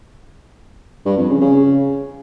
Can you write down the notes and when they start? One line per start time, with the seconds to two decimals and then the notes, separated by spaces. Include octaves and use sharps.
1.05 G2
1.17 F2
1.29 C#3
1.41 C#3